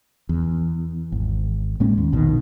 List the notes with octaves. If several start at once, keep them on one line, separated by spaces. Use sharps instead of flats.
E2
G#1
A2 G#3 A#3 C#4
D#2
A#1 B2 D#3